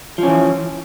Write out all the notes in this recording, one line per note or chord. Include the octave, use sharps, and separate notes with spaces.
E3 F3 C#4